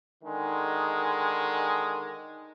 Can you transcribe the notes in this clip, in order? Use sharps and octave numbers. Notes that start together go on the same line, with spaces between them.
D3 D#3 G#3